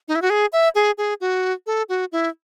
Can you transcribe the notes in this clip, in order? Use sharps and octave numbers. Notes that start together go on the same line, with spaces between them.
D#4
E4
F#4
G#4
E5
G#4
G#4
F#4
A4
F#4
E4